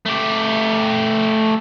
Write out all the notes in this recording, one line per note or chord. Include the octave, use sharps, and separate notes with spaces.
A3 G4